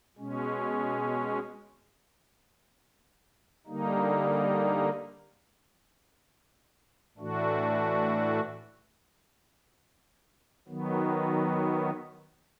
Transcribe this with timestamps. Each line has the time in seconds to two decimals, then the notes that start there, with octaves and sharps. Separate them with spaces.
0.17 B2 G#3 C#4
3.67 D3 G3 A#3 D#4
7.17 A2 E3 A3 D4 F#4
10.68 D#3 F#3 B3